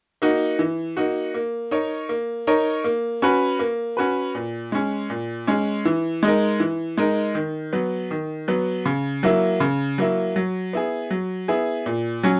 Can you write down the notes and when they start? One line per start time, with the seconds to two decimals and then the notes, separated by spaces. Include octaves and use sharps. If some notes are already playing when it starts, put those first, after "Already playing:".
0.22 A#3 D#4 F#4
0.59 E3
0.97 A#3 D#4 F#4
1.34 A#3
1.71 D#4 A#4 C#5
2.09 A#3
2.47 D#4 A#4 C#5
2.84 A#3
3.22 C#4 F#4 B4
3.59 A#3
3.97 C#4 F#4 B4
4.35 A#2
4.72 G#3 C#4
5.10 A#2
5.47 G#3 C#4
5.85 E3
6.23 G#3 D#4 A#4
6.60 E3
6.98 G#3 D#4 A#4
7.35 D#3
7.73 F#3 B3
8.11 D#3
8.48 F#3 B3
8.86 C#3
9.23 F#3 A#3 E4
9.60 C#3
9.98 F#3 A#3 E4
10.36 F#3
10.73 B3 E4 G#4
11.11 F#3
11.48 B3 E4 G#4
11.86 A#2
12.23 F#3 C#4